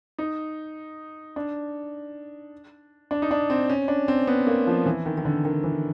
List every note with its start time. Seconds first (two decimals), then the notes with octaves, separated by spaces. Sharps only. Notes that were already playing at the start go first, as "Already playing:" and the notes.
0.19 D#4
1.36 D4
3.11 D4
3.22 D#4
3.31 D4
3.50 C4
3.69 C#4
3.88 D4
4.08 C4
4.27 B3
4.47 A#3
4.67 F3
4.86 E3
5.06 D#3
5.18 D#3
5.25 D3
5.45 D#3
5.64 E3